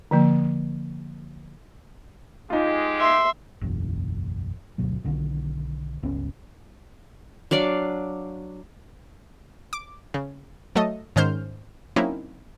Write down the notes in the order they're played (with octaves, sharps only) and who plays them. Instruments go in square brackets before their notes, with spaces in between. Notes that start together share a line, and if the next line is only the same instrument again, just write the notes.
[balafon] D3 F3 A#3
[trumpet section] G#3 G4 [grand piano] D#4 F4
[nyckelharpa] E5 [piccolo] C6
[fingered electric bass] F#1 B1 E2
F#1 D2 B2 F#3
B1 D3 D#3
G1 C#2 B3 C#4
[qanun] F#3 D4 D5 F5
[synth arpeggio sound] D6
C#3
F#3 A3 A4 D#5
G#2 D#3 C#4 C5 F6 G6
F#3 A#3 C4 C#4 D#4 E4